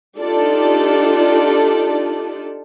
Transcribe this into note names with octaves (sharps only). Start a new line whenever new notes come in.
D4 D#4 F4 G4 A4 D5